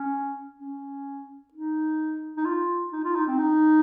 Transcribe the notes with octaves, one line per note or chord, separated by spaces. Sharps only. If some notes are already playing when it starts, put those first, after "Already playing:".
Already playing: C#4
C#4
D#4
D#4
F4
D#4
F4
D#4
C4
D#4